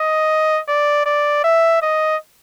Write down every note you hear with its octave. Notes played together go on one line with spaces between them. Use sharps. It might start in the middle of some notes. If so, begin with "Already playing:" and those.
Already playing: D#5
D5
D5
E5
D#5